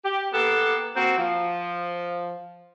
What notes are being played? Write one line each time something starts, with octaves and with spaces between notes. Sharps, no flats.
G4
A#3 B3 G4 A4
A#3 C4 F#4
F3